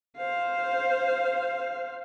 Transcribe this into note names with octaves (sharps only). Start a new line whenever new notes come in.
C5 F5